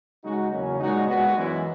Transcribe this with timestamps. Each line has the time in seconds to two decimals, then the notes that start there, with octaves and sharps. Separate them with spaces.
0.23 C#3 G#3 D#4 F#4
0.51 E2 C#3 F#3 A#3 C#4
0.79 A#2 G#3 D#4 F#4
1.07 A#2 G#3 B3 F#4
1.35 F#2 E3 G#3 B3 E4